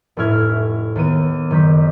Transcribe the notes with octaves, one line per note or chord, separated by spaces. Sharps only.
F1 A2 C#4 E4 F6 G#6
D#2 B3 D#7
F#1 D#3 G6 B6